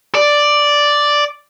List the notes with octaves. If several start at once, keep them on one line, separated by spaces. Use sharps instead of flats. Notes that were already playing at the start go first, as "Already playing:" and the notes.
D5